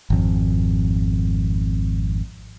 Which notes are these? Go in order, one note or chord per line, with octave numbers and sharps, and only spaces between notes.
G#1 F2